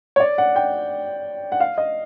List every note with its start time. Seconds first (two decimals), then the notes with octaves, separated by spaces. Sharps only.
0.16 C#5
0.20 D5
0.38 F#5
0.56 G5
1.52 F#5
1.60 F5
1.78 D#5